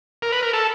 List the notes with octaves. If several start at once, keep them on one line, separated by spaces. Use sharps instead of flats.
A#4
B4
A#4
A4